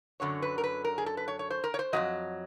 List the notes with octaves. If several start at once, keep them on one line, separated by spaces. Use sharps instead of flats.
F#2 D3 F#3 C#5
B4
A#4
B4
A#4
G#4
A4
B4
C#5
C#5
C5
A#4
C#5
C5
F2 C#3 F#3 D#5